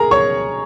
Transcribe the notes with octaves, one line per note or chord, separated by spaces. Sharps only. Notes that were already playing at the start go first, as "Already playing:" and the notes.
Already playing: G#4 A#4 A#5
C#5 C#6